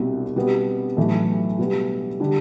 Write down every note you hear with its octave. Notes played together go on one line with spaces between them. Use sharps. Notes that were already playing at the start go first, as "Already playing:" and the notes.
Already playing: C2 B2 G3
B2 G3 B3
B1 A2 E3 A3
B2 G3 B3
D3 G3 D4